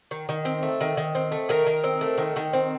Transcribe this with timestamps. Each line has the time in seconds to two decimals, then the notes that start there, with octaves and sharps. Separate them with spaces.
0.11 D#3
0.29 D#3
0.45 C4
0.63 A3
0.81 D#3
0.97 D#3
1.15 C4
1.32 A3
1.49 D#3 A#4
1.66 D#3
1.84 C4
2.01 A3
2.18 D#3
2.36 D#3
2.53 C4